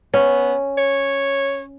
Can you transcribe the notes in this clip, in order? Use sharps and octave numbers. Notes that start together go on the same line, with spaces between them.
B3 C#4
C#5